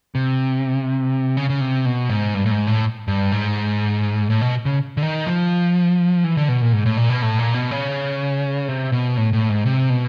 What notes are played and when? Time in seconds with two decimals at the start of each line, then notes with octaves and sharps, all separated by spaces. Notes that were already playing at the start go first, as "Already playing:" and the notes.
0.15 C3
1.37 C#3
1.50 C#3
1.61 C3
1.85 B2
2.10 G#2
2.34 G2
2.46 A2
2.51 G#2
2.67 A2
3.08 G2
3.32 G#2
4.30 A2
4.41 B2
4.65 C#3
4.97 D3
5.03 D#3
5.27 F3
6.24 E3
6.37 D3
6.48 B2
6.62 A#2
6.73 G#2
6.86 A2
6.97 A#2
7.10 B2
7.22 A2
7.39 A#2
7.54 B2
7.71 C#3
8.68 C3
8.92 B2
9.17 A2
9.33 A2
9.49 G#2
9.66 C3
9.90 B2